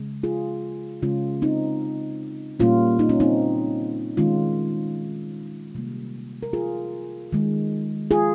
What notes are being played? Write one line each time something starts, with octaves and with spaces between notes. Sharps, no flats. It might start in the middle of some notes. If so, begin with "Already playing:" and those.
Already playing: C#3 G#3
F4 G#4
C#3 G#3 C#4 F4
C4 D#4
A#2 G3 A#3 C#4 F4
D#4
C#4
C4 D#4
D#3 G#3 C#4 F4
C3 G3 A#3
A#4
F4 G#4
D#3 G#3
F4 G#4